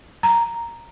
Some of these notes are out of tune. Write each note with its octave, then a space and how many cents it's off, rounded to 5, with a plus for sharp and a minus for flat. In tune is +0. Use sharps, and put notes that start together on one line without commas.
A#5 +0